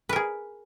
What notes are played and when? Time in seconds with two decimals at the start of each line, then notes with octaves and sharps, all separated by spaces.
0.09 B4
0.13 A#4
0.16 G#4